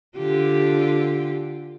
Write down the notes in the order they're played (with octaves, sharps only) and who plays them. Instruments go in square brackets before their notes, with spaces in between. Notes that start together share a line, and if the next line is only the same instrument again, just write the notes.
[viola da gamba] D3 F4 G4